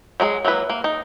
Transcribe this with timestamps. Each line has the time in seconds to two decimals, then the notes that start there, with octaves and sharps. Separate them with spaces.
0.20 F#3 G#3 F4 G#4
0.45 F#3 A#3 E4 B4
0.70 A#3
0.84 D#4